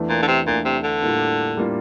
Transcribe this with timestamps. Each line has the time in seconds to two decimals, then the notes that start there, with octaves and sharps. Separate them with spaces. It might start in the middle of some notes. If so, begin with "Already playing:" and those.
Already playing: E2 E3 A3 D4
0.09 A#2
0.23 D3
0.28 C3
0.46 E2 A#2 E3 A3 D4
0.65 C3
0.83 D3
1.03 A2 G3 A#3 D4 F4
1.57 A2 G3 A#3 D4 F4